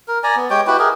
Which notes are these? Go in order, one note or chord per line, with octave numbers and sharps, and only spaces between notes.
A#4
D5 G#5 A#5
B3
G#3 G4 C#5 G5
E4 F#4 G4 B4
G4 G#4 A#4 D#5